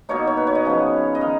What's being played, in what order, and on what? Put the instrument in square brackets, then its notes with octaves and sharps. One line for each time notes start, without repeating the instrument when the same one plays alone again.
[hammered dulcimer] B2 A#3 D#4 C#5
C#5
B4
C#5
D#5
C#3 F3 B3
D#5
D#3 F5